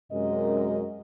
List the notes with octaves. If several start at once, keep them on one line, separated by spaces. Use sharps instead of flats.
F#2 C3 G#3 C#4 A#4 D#5